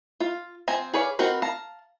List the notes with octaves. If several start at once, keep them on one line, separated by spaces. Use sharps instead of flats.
F4 F5
F3 C4 C5 G#5 A#5
G#4 B4 C#5 D5 F5
C4 D#4 F#4 A#4 B4
F5 A5 A#5